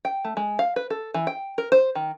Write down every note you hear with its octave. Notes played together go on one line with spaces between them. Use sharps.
G5
A3
G#3
F5
B4
A4
E3
G5
A#4
C5
D#3